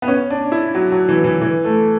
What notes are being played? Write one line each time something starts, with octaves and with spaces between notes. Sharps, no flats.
B3
C#4
D4
E4
F#3
F#3
E3
E3
E3
A3